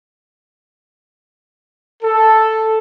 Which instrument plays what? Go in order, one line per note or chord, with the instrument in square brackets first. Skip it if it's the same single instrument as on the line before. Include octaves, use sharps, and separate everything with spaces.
[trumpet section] A4